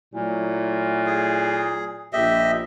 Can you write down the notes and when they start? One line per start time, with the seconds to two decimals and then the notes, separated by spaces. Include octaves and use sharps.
0.14 A#2 F#3 A3 E4
1.07 G#4
2.13 A#1 G4 D#5 E5